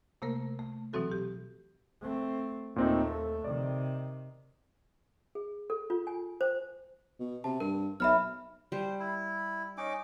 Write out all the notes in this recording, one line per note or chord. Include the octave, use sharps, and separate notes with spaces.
C3 A3 A#3 A#4
A3
B2 E3 F#3 C4 F#4 A4
G4
A3 C4
D#2 A#2 A3 C4 D#4
A4
C3 D#3 D5
G#4
A4
F4
G#5
C5
B2
C3 A5
G2 A#4
B1 E5 B5 F6
G3 C5
E4
C#4 D#4 D6